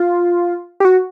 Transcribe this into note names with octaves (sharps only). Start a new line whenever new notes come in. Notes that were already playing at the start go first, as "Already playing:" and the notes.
Already playing: F4
G4
F#4